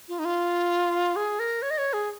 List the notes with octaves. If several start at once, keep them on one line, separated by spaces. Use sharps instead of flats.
F4
D#4
F4
G#4
A#4
C#5
D#5
C#5
G#4